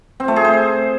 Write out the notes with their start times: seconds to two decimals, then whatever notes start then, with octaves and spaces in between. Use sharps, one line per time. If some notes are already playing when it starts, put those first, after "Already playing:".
0.20 C4
0.28 A3
0.36 G#4
0.45 C5